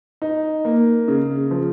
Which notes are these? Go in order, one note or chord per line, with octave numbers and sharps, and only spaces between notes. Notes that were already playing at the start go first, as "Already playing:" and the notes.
D#4
A#3
C#3
F3